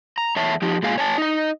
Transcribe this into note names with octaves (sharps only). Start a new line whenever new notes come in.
A#5
E2 C#5 E5 A5
F3 D#4 G4
A#2 G#3 F5 G#5
C#5 G#5 A5
D#4 D#5